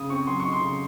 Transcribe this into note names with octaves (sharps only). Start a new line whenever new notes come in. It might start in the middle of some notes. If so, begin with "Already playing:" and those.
Already playing: C#3 D#6
C4 C#6
F#3 C6
D#4 C#6
C6
C#3